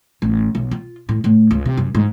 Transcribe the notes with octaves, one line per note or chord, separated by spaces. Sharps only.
A1
B1
F4
A2
A2
C#2
C3
F#2
G#2